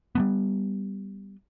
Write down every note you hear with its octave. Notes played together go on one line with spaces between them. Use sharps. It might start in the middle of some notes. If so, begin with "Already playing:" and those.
G3 A3 B3